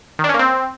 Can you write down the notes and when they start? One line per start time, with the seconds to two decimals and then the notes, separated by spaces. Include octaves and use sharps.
0.19 D#3
0.24 D4
0.29 C#4
0.34 A#3
0.39 C4